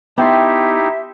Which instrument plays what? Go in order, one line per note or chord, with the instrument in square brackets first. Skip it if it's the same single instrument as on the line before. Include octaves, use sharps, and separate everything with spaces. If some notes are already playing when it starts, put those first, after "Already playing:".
[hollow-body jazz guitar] B3 [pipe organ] D#4 E4 G4 [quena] E5 [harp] G5 A5 C6